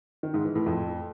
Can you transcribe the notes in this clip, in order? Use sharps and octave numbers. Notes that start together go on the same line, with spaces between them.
D#3
G#2
E3
A2
F2